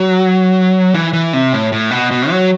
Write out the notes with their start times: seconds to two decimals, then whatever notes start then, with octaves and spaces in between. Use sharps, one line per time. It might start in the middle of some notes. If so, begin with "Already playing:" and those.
Already playing: F#3
0.94 E3
1.13 E3
1.33 C3
1.53 A2
1.72 A2
1.91 B2
2.11 B2
2.30 F#3